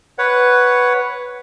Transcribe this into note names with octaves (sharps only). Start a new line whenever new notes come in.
B4 C#5 F#5